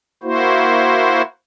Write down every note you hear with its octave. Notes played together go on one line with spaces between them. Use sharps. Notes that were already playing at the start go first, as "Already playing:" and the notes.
A#3 E4 F#4 C5